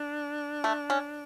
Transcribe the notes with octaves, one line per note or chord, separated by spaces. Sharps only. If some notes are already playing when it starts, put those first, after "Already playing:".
Already playing: D4
A3
C#4